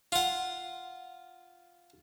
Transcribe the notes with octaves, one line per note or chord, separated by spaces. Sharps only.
F4 F#5